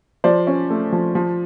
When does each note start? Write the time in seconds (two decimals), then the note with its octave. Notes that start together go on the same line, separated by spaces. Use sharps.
0.24 F3 C5 D5
0.47 C#4
0.70 A3
0.92 F3
1.15 F3